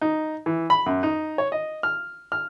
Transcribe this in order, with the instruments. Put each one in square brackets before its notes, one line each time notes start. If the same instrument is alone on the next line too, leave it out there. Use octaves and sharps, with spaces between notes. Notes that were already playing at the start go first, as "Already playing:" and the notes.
[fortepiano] D#4
E3
B5
F#2
D#4
C#5
D#5
F6
F6